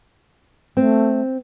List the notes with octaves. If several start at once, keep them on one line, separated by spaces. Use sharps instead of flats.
A3 C4